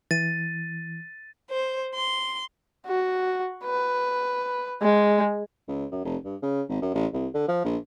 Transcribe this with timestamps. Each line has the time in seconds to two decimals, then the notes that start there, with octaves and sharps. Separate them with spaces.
0.11 E3 A6 D#7
1.51 C5
1.95 C6
2.87 F#4
3.65 B4
4.82 G#3
5.68 C#2
5.91 F#2
6.04 F1
6.24 G2
6.42 C#3
6.69 G#1
6.82 F#2
6.94 A1
7.13 C2
7.34 D3
7.48 F3
7.64 A#1